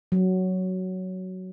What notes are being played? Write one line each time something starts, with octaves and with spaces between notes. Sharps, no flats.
F#3